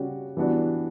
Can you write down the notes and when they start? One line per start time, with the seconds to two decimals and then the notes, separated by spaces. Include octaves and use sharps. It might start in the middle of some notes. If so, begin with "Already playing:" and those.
Already playing: C#3 G3 C#4 F#4
0.37 E3 G3 B3 D4 F#4